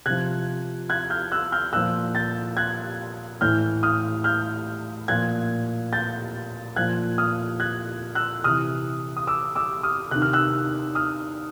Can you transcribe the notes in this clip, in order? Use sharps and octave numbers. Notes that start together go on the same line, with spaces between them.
C3 F3 F#6 G#6
F#6 G#6
F6 G6
E6 F#6
F6 G6
A#2 F3 E6 F#6
G6 A6
F#6 G#6
A2 E3 F6 G6
D#6 F6
F6 G6
A#2 F3 F#6 G#6
G6 A6
A#2 F3 F#6 G#6
D#6 F6
F#6 G#6
E6 F#6
C3 E3 D#6 F6
D#6
D6 E6
D6 E6
D#6 F6
C3 D#3 F#6
F6
E6 F#6
D#6 F6